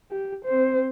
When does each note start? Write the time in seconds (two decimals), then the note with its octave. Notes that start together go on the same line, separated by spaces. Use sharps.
0.11 G4
0.45 C4 C5